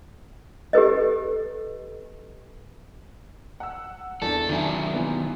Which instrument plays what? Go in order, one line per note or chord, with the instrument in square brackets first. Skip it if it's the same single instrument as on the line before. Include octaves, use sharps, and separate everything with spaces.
[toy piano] G4 A4 B4 D#5
[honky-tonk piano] F#5 E6
[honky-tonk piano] E2 D4 [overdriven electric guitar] A4
[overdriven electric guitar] D#3 F#3 [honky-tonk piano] D4 E4 G#5
[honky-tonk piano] E3 B3